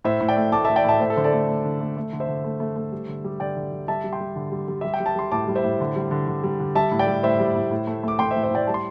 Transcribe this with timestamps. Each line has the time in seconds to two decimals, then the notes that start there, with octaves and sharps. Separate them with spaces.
0.04 A2 C5 E5
0.20 A2
0.29 D5 G5
0.36 A3
0.52 A3 A5 D6
0.65 A3 E5 A5
0.76 D5 G5
0.84 A2 E5 A5
1.00 A3 C5 E5
1.10 A4
1.17 D3 C5
1.24 A4 D5
1.33 A3
1.48 A3
1.65 D3
1.80 A3
1.97 A3
2.13 D3
2.20 C5 E5
2.28 D3
2.44 A3
2.60 A3
2.76 A3
2.92 G3
3.08 D3
3.24 G3
3.40 D3 D5 G5
3.57 D3
3.73 D3
3.88 G3 E5 A5
4.04 G3
4.12 G5 C6
4.20 G3
4.36 D3
4.52 G3
4.68 G3
4.81 G3 E5
4.94 G5
5.00 G3
5.06 A5
5.15 G3 C6
5.31 A2 A5 D6
5.48 G3
5.55 C5 E5
5.64 A2
5.80 D3
5.96 G3
6.11 D3
6.28 D3
6.44 G3
6.60 D3
6.75 G3 E5 A5
6.92 A2
6.99 D5 G5
7.07 G3
7.23 A2 C5 E5
7.40 G3
7.56 A2
7.71 A2
7.87 A3
8.03 A3 D6
8.19 A3 G5 C6
8.31 C5 E5
8.36 A2
8.43 C5 E5
8.51 A2 D5 G5
8.67 G3 A5
8.74 C6